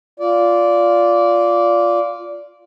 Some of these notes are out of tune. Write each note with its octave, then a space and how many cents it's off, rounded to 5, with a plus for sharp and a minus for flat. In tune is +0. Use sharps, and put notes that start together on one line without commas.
F4 +0 D5 -15